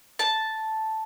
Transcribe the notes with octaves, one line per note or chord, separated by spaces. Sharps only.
A5